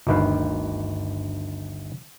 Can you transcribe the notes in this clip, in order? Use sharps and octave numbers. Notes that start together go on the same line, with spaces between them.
G1 D2 D#3 B4 F5